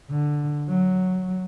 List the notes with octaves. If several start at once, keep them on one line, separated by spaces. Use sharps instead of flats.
D3
F#3